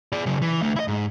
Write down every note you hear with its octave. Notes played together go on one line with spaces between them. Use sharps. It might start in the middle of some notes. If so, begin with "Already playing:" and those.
G#4 D5
C#3 F#3
E3
D3 A3
E4 D#5
G#2